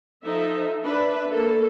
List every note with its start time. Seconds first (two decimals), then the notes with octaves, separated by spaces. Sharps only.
0.24 F3 D#4 A4 E5
0.85 D4 B4 E5
1.29 A#3 A4